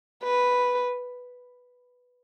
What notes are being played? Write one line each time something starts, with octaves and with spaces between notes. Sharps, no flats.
B4